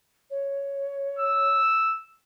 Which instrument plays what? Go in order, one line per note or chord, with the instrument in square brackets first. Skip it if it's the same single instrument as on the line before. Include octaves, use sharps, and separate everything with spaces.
[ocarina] C#5
[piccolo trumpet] E6